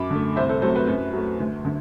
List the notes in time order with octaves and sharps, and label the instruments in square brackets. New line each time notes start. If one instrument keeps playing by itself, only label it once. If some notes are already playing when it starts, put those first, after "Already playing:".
Already playing: [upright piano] F#2 B5 D6
D3 A3
C2 C5 E5
A4 C5
C3 F#3 A3 A4 C5
B4
F#2
F#3 A3
D2
D3